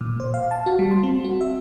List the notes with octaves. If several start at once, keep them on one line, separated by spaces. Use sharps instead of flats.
A#2
C5
F5
A5
F#4
G3
C6
C4
F#4
E5